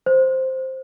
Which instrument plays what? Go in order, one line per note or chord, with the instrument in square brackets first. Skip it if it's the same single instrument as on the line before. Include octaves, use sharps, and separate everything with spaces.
[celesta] C5